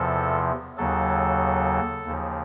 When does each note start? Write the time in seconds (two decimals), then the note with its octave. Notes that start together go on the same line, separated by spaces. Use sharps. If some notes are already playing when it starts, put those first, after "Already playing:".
Already playing: E2 C3 F3 A4
0.78 D#2 C#3 F#3 A4
2.06 D#2 C#3 F3